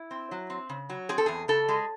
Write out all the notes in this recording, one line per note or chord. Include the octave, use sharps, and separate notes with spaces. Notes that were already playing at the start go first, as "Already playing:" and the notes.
Already playing: E4
C4
F#3
C4
C#3
F#3
C4 G#4
A4
E2 G#4
C#3 A4
G#3